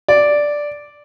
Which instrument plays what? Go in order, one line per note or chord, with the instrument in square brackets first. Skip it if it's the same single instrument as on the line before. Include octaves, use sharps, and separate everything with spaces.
[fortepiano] D5